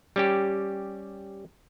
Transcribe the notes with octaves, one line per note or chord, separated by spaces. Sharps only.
G3 C#4 G4